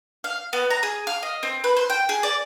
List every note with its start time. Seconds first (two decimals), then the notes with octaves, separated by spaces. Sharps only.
0.24 F5
0.53 B3
0.70 A#5
0.83 G#4
1.07 F5
1.23 D#5
1.43 C4
1.64 B4
1.77 C5
1.90 G5
2.09 G#4
2.23 D5